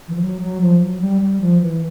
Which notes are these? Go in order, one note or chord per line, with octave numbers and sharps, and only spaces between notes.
E3
F3
F#3
F#3
F3
F#3
G3
G3
F3
E3